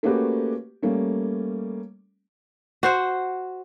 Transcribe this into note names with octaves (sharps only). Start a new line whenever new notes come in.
A3 A#3 C#4 F#4 G4 B4
G3 A3 A#3 C#4
F#4 C5 F#5